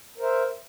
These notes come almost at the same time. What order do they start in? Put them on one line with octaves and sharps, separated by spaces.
A#4 C5 E5